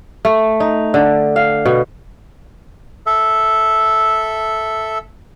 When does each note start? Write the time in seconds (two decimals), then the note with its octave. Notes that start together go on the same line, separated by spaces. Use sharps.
0.25 A3
0.60 D#4
0.94 D3
1.36 F5
1.66 B2
3.06 A4 E5